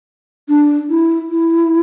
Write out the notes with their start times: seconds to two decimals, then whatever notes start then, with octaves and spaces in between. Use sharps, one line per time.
0.49 D4
0.90 E4
1.30 E4